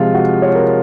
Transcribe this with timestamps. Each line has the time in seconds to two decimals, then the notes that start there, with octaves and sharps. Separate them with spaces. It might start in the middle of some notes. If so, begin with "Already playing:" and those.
Already playing: C3 F3 G#3 F4
0.14 F#4
0.42 C#5
0.55 A#4